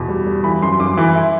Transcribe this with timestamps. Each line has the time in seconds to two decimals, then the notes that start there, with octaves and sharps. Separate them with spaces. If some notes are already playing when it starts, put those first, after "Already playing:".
Already playing: E2 B2
0.09 G3
0.27 G3
0.44 E3 B5
0.62 F#2 C6
0.79 F#2 D6
0.97 E3
1.15 E4